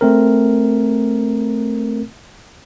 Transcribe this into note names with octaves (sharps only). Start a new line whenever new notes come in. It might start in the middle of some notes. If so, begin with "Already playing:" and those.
A3 C4 A#4